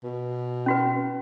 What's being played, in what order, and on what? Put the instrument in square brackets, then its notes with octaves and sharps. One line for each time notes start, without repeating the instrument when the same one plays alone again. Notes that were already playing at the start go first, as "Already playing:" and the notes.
[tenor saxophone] B2
[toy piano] C#4 F#4 B4